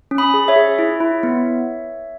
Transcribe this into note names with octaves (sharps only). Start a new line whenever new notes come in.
C#4
B5 D#6
G#4
C#5 E5
G#4
E4
E4
B3